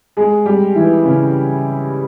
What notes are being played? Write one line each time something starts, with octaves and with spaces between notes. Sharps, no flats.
G#3 G#4
G3 G4
E3 E4
C#3 C#4